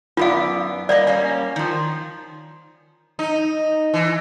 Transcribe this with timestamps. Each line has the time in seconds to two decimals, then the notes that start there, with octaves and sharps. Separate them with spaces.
0.17 F#2 B3 F4 D5 F5
0.89 G3 A#3 D5 D#5
1.07 G3 A#3 C#4
1.56 D#3 F3
3.19 D#4
3.94 E3